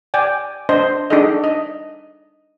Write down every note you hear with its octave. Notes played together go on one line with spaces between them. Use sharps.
D5 G5 G#5
D4 C5 D#5 C6
D4 D#4 G#4 A4 D#5
D#5